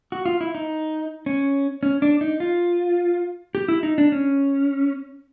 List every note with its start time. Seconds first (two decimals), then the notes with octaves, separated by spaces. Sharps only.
0.12 F#4
0.26 F4
0.41 E4
0.55 D#4
1.26 C#4
1.83 C#4
2.02 D4
2.21 D#4
2.40 F4
3.55 G4
3.68 E4
3.83 D#4
3.98 D4
4.12 C#4